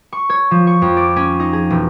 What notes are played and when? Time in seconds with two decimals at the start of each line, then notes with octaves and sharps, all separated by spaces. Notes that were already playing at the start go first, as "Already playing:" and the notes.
0.13 C#6
0.30 C#5
0.51 F3
0.67 C#6
0.82 F2
0.97 D5
1.16 C#4
1.40 D#4
1.53 G#4
1.70 E1